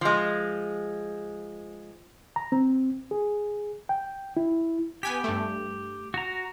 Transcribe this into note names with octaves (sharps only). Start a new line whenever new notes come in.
F3 G#3
A#5
C4
G#4
G5
E4
B3 G4 G#5 B6
G2 A3
F#4 A#5